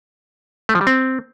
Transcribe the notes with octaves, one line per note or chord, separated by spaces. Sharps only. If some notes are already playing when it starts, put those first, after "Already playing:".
A3
F3
G3
C4